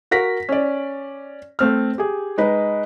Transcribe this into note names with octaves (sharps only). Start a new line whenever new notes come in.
F#4 A#4 A#6 B6
C#4 D5
A3 C4 F6
G4 G#4
G#3 D#4 B4